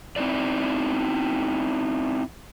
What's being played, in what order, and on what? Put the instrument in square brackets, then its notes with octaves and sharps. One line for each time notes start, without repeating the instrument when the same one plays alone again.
[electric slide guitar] C4 D#4 E4 D5